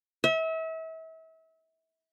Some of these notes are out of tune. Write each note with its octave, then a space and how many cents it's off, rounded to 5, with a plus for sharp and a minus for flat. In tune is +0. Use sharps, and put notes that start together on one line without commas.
E5 -35